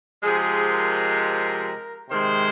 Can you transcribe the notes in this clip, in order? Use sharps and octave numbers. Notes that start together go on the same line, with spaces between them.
C3 F3 G#3 G#4
A#4
C3 D#3 G#3 C5